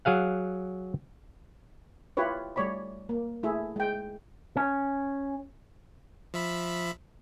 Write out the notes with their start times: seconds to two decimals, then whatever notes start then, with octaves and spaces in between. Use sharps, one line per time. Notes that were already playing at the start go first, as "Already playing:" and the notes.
0.05 F#3 G#4 F5 F#5
2.17 E4 F4 G4 B4 C#5
2.56 G3 A3 C#5 D5 B5
3.09 A#3
3.43 A3 E4 G#4 E5
3.76 G#3 G5
4.57 C#4
6.34 F3 E5 B5